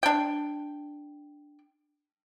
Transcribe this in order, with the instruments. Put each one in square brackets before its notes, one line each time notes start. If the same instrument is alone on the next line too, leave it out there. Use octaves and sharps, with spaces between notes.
[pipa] D4 G5